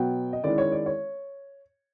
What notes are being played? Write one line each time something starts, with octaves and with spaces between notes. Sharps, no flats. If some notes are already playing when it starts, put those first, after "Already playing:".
Already playing: B2 F#3 B3 G5
D#5
D#3 G#3 C#4 E4 D5
C#5
D5
C#5